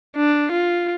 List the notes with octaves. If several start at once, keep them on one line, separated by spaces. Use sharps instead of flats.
D4
F4